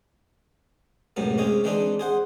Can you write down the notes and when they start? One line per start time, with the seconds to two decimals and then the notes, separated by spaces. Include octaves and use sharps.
1.16 C#2 F#2 A2 C3 B3
1.38 C3 G#3 C#4 G#4
1.64 E3 G#3 C4 D4 D#4
2.00 G#4 C5 F#5